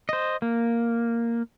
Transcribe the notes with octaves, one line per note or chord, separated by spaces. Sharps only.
C5 D#5
A#3